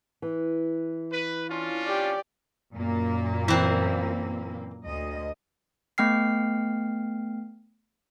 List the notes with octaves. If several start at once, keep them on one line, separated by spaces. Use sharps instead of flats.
E3
B4
C#4 D4 F4
G4 D5
F#2 A#2 A#3
E3 C4
D2 D#5
A3 B3 G5 F6 C7